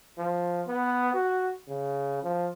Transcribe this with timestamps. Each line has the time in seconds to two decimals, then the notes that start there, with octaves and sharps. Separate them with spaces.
0.18 F3
0.67 B3
1.14 F#4
1.68 C#3
2.23 F3